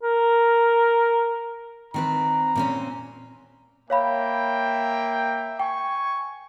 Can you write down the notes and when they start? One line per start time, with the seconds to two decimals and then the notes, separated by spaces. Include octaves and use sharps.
0.03 A#4
1.94 D#3 C4 B4 A#5
2.56 A#2 C4 C#4
3.90 A#3 C#5 E5 F5 G5 B5
5.60 G5 G#5 C#6